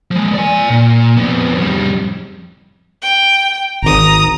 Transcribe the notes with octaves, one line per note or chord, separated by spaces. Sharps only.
F3 G#3
D5 G#5
A#2
F2 B3
F2 G3
G5
G#1 A#5 D#6